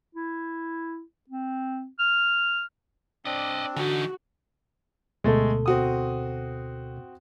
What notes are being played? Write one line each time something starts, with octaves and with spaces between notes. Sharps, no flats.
E4
C4
F6
C4 D4 D5 D#5
D3 E3 D#4 F#4
D2 B2 G#3 A3 A4
C4 F#4 D#6